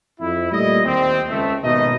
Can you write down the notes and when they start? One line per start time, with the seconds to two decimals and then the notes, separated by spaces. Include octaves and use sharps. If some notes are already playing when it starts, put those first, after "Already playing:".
0.20 F2 E4
0.52 A#2 G3 A3 D#5
0.85 D#2 C4
1.30 C#2 A3
1.63 G#1 D#2 B2 D#4 D#5